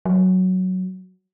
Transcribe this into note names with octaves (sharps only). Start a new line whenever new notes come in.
F#3